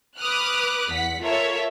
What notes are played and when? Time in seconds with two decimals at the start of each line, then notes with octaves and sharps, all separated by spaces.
0.18 B4 D6 D#6 F6 F#6
0.92 E2 F#5 B6
1.23 F4 A4 A#4 C#5 E5